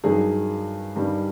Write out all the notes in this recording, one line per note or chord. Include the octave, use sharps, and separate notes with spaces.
G2 D#3 F#3 G#4
G2 D#3 G3